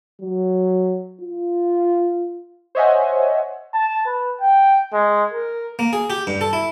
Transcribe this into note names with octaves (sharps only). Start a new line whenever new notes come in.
F#3
F4
C5 C#5 D#5 E5 F#5 G#5
A5
B4
G5
G#3
A#4
A#3
G#4
G4
G2
A4
E4